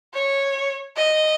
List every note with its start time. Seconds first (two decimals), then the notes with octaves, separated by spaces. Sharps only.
0.14 C#5
0.96 D#5